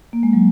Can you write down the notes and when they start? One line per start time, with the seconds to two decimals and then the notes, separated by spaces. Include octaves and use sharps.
0.13 A#3
0.23 G#3
0.33 F#3